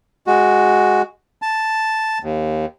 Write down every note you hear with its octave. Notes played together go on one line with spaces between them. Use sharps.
G#3 F#4
A5
D#2